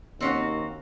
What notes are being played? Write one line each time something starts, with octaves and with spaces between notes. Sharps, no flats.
D#2 C4 C#4 F#4